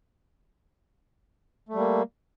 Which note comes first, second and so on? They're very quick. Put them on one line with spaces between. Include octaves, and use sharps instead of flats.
A3 G3 A#3